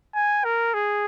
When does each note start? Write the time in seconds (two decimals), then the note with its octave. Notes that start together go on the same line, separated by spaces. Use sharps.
0.15 G#5
0.44 A#4
0.74 G#4